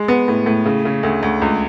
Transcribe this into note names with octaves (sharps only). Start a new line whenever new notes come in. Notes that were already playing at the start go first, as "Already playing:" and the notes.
Already playing: G#3
B3
A2
A2
C#3
C#3
D2
D2
C#2